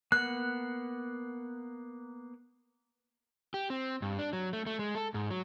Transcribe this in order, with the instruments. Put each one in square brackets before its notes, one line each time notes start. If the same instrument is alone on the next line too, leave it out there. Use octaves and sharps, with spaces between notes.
[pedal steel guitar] A#3 B3 F#5 [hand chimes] F#6
[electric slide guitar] G4
C4
G2
D4
F#3
A3
A3
G#3
A4
G#2
F#3